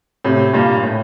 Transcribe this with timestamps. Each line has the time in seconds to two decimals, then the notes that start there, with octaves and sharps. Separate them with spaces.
0.25 A2 C3
0.53 G2 A#2
0.83 A2